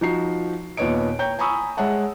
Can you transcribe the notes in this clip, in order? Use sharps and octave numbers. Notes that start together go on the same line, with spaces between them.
F3 D#4 F#4 C7
D#2 A#2 B3 C#5 D#5 D7
C#5 G5 A#5 G6
G#5 A#5 B5 C#6 D#6 E6
G#3 C#5 E5 F#5 A5